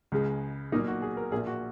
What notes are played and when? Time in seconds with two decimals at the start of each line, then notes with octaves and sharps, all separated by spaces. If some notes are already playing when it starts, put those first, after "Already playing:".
0.12 C#2 C#3 G#3
0.72 B1 A#2 A#3 D#4
0.87 F#4
1.02 G#4
1.17 A#4
1.32 A#1 A#2 A#3 G#4
1.47 F#4